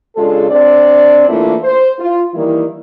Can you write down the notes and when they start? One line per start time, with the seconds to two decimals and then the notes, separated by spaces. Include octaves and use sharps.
0.17 C#3 G#3 D4 F4 A4
0.50 C4 D4 C#5 D5
1.29 E3 A3 A#3 D4 E4 F4
1.63 C5
1.99 F4
2.34 D#3 E3 G3 A#3 E4